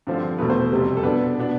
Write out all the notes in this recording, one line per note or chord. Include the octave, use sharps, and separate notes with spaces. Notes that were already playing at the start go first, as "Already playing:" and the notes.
G2 D3 F3 C4
E2 B2 A3 B4
C5
F2 C3 G3
A4
B2 B3 D4 B4
B2 B3 D4